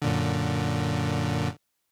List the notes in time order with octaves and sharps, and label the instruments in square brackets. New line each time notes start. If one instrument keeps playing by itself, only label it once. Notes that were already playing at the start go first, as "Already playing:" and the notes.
[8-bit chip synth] F#2 A#2 D3